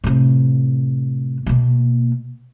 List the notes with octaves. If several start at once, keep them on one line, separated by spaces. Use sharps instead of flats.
A2 C3
B2 A#3